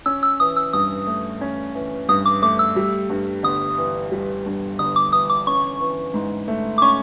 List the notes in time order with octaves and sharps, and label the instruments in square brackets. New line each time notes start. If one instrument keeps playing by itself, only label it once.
[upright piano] C#4 [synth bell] E6
[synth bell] E6
[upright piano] E3 [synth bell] D#6
[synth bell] E6
[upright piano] G2 [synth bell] D#6
[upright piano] A3
C#4
E3
[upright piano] G2 [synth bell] D#6
[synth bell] D6
[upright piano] A3 [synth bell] D6
[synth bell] E6
[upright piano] G3
G2
[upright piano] G1 [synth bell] D#6
[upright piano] E3
G3
G2
[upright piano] G1 [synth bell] D#6
[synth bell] D6
[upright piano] E3 [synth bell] D#6
[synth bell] D6
[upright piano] C#4 [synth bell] C#6
[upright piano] E3
G#2
A3
[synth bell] D6
[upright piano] C#4 [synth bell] C#6